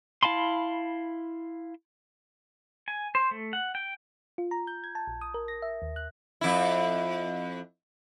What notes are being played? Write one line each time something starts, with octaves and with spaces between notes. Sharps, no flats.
E4 F5 A5 B5 C6
G#5
C5
A3
F#5
G5
F4
A#5
G6
G#6
A5
A#1
D#6
A#4
A#6
E5
D#2
F#6
F2 E4